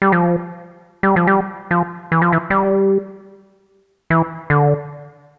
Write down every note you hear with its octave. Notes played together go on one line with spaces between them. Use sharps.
G3
F3
G3
F3
G3
F3
E3
F3
E3
G3
E3
D3